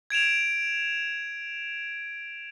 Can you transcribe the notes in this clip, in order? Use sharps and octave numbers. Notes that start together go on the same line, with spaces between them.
G#6 D7 E7 F7